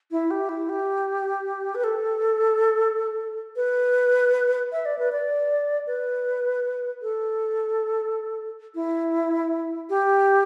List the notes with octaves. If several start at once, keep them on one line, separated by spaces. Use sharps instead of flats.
E4
G4
E4
G4
B4
A4
B4
E5
D5
B4
D5
B4
A4
E4
G4